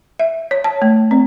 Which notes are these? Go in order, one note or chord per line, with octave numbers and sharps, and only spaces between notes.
E5
C#5
A5
A3
C4